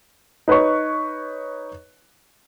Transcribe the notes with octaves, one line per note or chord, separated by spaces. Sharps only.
D#4 B4 C#5 C#6